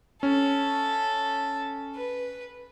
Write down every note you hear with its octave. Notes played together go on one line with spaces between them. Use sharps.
C#4 A4
B4